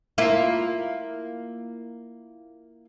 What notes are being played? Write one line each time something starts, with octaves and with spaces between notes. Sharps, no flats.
A#3 E4 F4